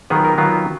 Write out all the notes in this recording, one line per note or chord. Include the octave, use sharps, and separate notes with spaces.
D#3 F#3 B3 F4 G#4
A#4
D#3 F#3 B3 F4